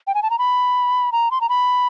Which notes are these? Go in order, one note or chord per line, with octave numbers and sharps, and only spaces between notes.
G5
G#5
A5
A#5
B5
A#5
C6
A#5
B5